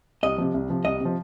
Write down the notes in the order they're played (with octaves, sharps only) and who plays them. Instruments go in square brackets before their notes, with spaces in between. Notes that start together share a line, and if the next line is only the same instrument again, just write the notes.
[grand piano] C2 [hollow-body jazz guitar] D#5
[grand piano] C3 F3
C2
C3 F3
[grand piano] C2 [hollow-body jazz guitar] D#5
[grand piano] C3 F3